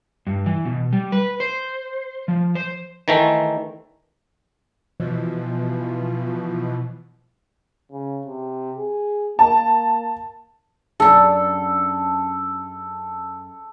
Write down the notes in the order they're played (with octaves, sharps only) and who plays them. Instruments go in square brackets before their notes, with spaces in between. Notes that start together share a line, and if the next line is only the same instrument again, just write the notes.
[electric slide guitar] G2
E3
B2
G3
B4
C5
F3
C5
[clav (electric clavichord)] D#3 E3 A3
[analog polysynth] B2 E3 F3
[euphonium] C#3
C3
G#4
[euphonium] A#3 [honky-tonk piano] A5
[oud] F#2 D4 [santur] A4